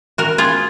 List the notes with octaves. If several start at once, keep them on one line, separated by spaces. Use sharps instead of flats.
F#4 A#4
F4 G#4